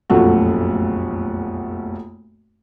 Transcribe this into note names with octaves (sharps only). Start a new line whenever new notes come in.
F1 B1 F#2 A#2 A3 F#4